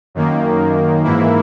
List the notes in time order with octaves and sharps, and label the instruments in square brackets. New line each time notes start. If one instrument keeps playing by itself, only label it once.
[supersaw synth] F#2 D#3 A#3
G#2 E3 A#3 E4